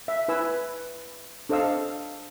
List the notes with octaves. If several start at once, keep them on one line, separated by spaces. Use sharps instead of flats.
E5
E4 B4 G#5 E6
D4 A4 C5 D#5 F5 E6